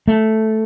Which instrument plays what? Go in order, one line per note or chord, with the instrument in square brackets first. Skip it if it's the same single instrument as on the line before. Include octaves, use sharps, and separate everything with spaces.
[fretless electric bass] A3